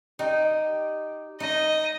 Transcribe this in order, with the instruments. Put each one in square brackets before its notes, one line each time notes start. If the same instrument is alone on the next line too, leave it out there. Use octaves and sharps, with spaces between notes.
[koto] D#4 [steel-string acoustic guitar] G4 D5 D#5
[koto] D#4 [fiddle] D#5